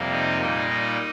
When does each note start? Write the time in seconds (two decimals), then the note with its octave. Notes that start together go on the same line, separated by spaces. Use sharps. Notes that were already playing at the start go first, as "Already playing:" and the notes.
Already playing: F2 C3 G3 A#3
0.12 D#4
0.41 A#2 G3 A#3
0.69 D#4